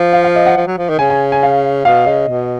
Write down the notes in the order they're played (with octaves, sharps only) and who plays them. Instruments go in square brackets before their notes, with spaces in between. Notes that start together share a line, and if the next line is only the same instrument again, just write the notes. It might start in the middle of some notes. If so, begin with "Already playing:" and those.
Already playing: [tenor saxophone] F3
[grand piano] F5
F5
D#5
F#5
[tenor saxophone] F3
F#3
F3
D#3
[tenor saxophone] C#3 [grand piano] G#5
[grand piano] G#5
G#5
F5
[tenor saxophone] B2 [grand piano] F5
[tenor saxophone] C#3 [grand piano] D#5
[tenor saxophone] B2